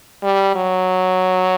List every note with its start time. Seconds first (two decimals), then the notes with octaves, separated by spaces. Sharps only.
0.23 G3
0.55 F#3